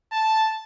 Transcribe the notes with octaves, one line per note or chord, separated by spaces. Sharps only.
A5